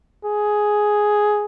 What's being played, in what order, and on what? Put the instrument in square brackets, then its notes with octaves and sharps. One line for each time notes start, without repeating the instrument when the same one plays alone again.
[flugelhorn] G#4